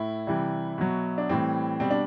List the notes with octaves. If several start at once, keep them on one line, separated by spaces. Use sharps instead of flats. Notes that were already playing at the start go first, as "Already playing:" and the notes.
Already playing: A2 E4
C3 E3 G3
B2 F#3
D4
A2 E3 G3 C4
B2 G3 C4
D4